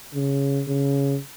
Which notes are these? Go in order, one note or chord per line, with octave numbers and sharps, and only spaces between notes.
C#3
C#3